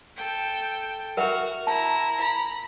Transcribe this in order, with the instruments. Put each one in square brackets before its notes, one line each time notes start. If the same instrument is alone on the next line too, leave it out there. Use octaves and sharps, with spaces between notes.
[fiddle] A4 G5
[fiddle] F#4 F6 [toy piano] A#4 E5 F#5
[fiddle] E4 A#5 [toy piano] A5
[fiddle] A#5 B5